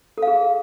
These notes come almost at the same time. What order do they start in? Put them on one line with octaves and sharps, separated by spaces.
A4 F5 G#4